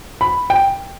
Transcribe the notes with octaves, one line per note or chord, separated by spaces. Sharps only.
B5
G5